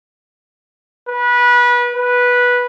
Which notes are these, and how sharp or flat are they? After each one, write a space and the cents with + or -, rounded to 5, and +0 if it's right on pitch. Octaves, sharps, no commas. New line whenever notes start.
B4 -25
B4 -10